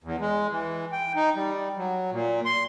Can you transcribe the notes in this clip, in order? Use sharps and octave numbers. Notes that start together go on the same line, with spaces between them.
E2
G#3
E3
G5
D#4
G3
F#3
A#2
C6